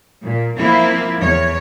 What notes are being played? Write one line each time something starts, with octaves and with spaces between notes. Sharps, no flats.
A#2
F3 A#3 C4 E4
E2 C#5